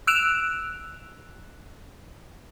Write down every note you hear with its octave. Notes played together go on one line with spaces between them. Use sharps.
E6 F#6 D7 E7 F7